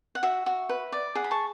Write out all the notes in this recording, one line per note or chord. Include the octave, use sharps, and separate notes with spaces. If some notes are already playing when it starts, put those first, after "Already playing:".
F#5
F#4 E5
F#4
B4
D5
G#4 F#5
B5
A5 C#6